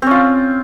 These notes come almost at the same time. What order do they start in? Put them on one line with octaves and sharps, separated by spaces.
C4 C#4 F4